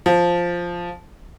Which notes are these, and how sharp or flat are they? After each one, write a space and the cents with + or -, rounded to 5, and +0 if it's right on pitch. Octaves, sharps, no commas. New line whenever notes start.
F3 +0